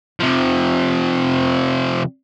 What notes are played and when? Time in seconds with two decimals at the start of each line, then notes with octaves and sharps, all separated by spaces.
0.20 C3 F3